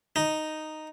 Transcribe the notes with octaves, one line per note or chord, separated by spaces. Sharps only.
D#4